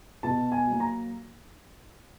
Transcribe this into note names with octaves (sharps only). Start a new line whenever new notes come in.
B2 A5
G#5
F#3 A#3
A#5